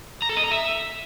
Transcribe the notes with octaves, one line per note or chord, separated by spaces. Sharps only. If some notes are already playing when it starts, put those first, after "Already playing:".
A#5
A4
D#5
A#5
E5